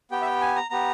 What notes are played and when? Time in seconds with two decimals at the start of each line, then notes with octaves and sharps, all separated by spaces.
0.11 B3 G4 G5
0.22 E5
0.26 G5
0.41 G#5
0.56 A#5
0.70 B3 G4 A#5